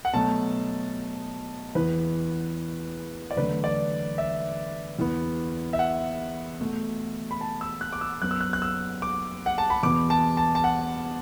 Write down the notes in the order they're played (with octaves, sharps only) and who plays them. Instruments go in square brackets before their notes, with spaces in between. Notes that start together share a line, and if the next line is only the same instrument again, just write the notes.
[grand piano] F#5
B2 F#3 A3 A5
E2 E3 B3 B4
D5
E2 D3 F#3 A3 B4
D5
E5
E2 E3 B3
E5
F#5
B2 A3
B5
A5
E6
F#6
D6
E6
F#2 F#3 B3 F#6
E6
F#6
F#6
E6
D6
F#5
A5
B5
E2 B2 B3 D6
A5
A5
A5
F#5